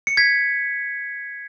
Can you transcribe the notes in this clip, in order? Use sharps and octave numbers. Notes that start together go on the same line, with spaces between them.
C#7
G#6 B6